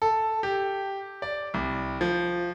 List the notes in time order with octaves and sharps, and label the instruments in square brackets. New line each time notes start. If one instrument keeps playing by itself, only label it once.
[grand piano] A4
G4
D5
C2
F3